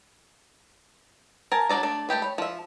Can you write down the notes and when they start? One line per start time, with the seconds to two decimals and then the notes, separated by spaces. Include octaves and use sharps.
1.52 A#4 G#5 A5
1.69 F#3 D4 D#4 D5 A#5
1.83 A3 D4 D5
2.09 A3 A#3 G4 B4
2.22 C#5 B5
2.38 F3 E5